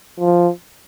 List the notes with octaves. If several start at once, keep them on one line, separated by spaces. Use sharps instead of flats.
F3